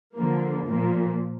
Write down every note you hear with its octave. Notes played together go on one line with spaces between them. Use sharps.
D3 F3 A#3
A#2 F3 A#3